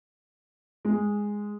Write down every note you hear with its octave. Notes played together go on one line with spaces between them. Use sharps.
G#3